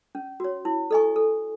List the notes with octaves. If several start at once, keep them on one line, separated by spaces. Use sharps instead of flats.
C#4
F#4 C#5
E4
A4 D#5 G#5 C#6
A4